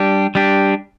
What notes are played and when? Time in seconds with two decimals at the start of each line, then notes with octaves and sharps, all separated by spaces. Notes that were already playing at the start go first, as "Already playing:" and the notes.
Already playing: G3 D4 G4
0.35 G3 D4 G4